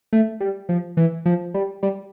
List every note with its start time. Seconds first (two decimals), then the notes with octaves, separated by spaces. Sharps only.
0.13 A3
0.40 G3
0.69 F3
0.97 E3
1.26 F3
1.54 G3
1.83 G3